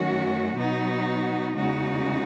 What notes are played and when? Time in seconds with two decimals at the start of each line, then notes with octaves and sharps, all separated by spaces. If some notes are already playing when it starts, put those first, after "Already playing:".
Already playing: F#2 D#3 A3 C#4 F#4
0.56 B2 F#3 B3 D#4 F#4
1.57 E2 C#3 G#3 D#4 F#4